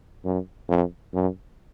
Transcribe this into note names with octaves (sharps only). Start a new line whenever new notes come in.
F#2
F2
F#2